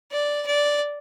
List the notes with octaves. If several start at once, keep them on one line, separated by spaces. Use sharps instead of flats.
D5
D5